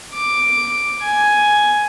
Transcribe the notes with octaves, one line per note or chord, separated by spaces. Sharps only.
D6
G#5